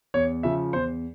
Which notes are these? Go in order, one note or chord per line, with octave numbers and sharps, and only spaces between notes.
E2 C#5
C#3 F3 E5
E2 C5